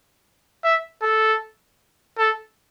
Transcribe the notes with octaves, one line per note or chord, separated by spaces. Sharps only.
E5
A4
A4